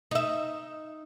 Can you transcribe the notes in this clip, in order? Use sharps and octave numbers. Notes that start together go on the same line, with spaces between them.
D#4 E5